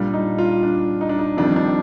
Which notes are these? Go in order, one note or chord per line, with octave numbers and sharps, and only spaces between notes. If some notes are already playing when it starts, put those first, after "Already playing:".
Already playing: A#2 G3 D4
D#4
F4
D4
D#4
D4
D#4
F2 D#3 G3 D4
D4